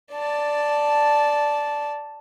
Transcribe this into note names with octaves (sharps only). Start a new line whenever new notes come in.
D5 A5